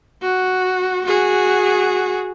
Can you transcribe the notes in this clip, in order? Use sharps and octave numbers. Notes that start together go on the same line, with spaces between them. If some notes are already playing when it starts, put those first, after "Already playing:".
F#4
F#4 G#4